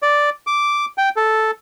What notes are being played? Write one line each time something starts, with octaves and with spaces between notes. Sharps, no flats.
D5
D6
G5
A4